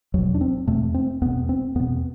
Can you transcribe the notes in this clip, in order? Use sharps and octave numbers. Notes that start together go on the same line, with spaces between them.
E2 B2 F#3
D4
C4
E2 B2 A3
C4
E2 B2 B3
C4
E2 B2 B3